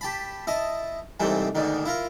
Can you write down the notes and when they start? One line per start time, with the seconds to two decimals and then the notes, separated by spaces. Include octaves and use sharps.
0.01 G4 A5 B5
0.47 E4 D#5 A5
1.20 C2 G#2 C3 E3 A3 C4
1.55 D2 G#2 B2 D3 D#3
1.85 E4 F4 A#4